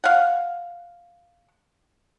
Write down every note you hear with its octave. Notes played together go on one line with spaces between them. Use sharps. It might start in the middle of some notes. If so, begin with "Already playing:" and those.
F5 F#5